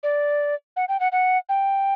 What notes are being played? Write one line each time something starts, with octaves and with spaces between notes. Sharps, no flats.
D5
F#5
G5
F#5
F#5
G5